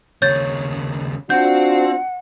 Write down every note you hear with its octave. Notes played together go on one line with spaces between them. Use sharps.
D#2 C#3 C#5 G6 A6
C4 D4 F4 F#4 F#5 G6